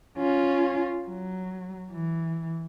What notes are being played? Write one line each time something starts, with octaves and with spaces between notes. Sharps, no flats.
C#4 F4
F#3
E3